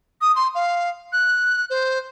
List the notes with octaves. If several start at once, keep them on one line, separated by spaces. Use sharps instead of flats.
D#6
C6
F5
F#6
C5